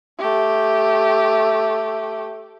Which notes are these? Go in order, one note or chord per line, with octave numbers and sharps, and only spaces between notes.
A3 G4